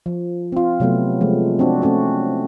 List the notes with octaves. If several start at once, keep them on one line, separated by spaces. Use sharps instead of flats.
F3
C4 F4
C3 F#3 A3 B3
F3 G#3 A3
C4 D4 F#4
A3 C4 C#4 F#4